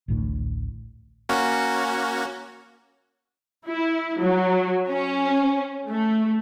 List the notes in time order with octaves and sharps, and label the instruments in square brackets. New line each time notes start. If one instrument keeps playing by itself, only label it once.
[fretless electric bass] A1 D2 A2 D3
[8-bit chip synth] A#3 C#4 F#4
[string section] E4
F#3
C#4
A3